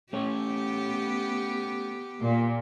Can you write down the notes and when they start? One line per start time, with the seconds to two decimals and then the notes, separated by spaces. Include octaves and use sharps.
0.13 A3 B3 C#4 G4 C#5
2.22 A#2